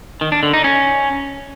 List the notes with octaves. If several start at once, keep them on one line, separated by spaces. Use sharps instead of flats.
D#3
D4
D3
D#4
C#4